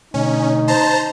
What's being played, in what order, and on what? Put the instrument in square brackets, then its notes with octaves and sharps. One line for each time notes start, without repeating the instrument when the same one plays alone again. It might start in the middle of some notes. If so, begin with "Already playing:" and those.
[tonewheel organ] B2 D3 A3 [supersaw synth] C#4 [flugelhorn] D#4
[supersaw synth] C5 A#5 [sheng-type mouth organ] A5